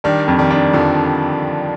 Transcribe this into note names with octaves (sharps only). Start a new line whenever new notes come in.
D#3 G3 D4
F2
D#3 G3
D4
F2 D3 F3